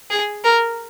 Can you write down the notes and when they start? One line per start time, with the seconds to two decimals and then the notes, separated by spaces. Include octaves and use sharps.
0.10 G#4
0.44 A#4